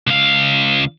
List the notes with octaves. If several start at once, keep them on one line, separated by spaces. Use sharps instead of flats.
C#2 F5